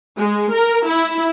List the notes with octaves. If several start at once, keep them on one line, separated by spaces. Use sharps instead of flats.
G#3
A#4
E4